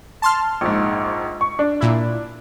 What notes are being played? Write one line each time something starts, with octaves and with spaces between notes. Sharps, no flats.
A5 C6 F6
A#1 G#2
C#6
D4
A#2 E4